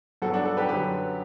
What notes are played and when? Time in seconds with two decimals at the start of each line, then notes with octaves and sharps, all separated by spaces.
0.22 G2 F#3 B3 F#4 A4
0.33 D4 F#4
0.45 F#4 A4
0.57 G4 B4
0.69 F#2 D3 F#3 G4 B4